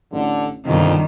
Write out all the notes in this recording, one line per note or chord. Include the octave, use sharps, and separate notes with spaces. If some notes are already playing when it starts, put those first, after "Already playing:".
A1 D3
G1 C2 F2 C3 D#3 G3